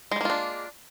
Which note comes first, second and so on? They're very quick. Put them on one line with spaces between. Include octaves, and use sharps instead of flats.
G#3 G3 A#3 F4 D4